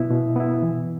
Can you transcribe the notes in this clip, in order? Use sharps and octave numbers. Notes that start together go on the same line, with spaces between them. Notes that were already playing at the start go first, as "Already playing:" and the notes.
Already playing: B2 B3 E4
B2
B3 E4
E3